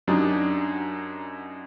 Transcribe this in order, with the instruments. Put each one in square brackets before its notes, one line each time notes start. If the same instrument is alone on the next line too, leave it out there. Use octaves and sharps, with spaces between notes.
[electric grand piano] F#2 F#3 D4 D#4 G4 D#6